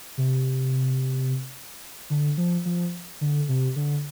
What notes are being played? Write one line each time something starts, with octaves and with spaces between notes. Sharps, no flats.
C3
D3
F3
F3
D3
C3
D3